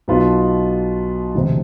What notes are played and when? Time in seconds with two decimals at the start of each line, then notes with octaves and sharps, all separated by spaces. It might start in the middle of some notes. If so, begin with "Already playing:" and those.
0.08 B1 B2 B3 F4
1.35 E1 D2 C3